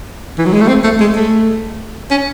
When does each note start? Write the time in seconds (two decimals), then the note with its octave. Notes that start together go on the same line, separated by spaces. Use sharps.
0.38 E3
0.46 F#3
0.53 G#3
0.61 A3
0.68 C4
0.84 A3
1.00 G#3
1.16 A3
2.11 C#4